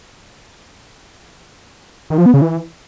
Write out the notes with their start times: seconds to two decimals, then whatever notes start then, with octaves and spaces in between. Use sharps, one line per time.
2.10 D#3
2.18 F3
2.26 B3
2.34 C#3
2.42 E3